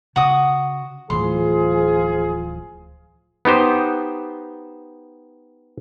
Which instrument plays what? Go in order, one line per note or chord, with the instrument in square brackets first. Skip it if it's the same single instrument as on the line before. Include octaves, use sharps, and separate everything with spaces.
[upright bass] C#3 [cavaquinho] F#4 D#6
[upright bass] D1 E3 [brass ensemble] F3 F4 G#4 [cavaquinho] C6
[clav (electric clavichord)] B3 D#4 G4 C5